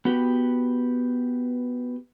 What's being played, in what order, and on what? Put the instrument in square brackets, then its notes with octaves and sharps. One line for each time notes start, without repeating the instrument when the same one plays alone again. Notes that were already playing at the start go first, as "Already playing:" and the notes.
[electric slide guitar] B3 F#4 G4 B4